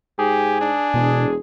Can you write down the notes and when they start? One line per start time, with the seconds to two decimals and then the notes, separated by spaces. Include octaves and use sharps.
0.19 G#2 G4 G#4
0.61 D4
0.94 E1 B2